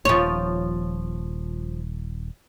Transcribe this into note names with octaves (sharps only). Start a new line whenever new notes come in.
D#1 F3 C#5